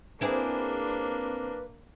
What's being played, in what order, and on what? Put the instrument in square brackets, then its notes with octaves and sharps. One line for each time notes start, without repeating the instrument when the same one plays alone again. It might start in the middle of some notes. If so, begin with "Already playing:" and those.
[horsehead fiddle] A#3 D4 [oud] C4 E4 G#4 [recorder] B4